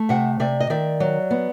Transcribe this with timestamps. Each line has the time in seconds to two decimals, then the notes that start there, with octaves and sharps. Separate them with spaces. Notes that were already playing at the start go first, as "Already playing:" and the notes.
Already playing: A3
0.09 C3 E5 F#5
0.40 C3 D5 E5
0.60 D#5
0.70 D#3 D5 E5
1.00 F#3
1.31 B3